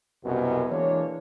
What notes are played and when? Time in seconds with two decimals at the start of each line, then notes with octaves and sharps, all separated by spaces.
0.25 C2 F#2 B2
0.70 E3 G#3 A#3 D4 C#5